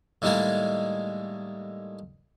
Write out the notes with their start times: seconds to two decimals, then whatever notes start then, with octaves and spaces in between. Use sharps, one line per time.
0.22 A2 D#3 G3 G#3 A#3 G#4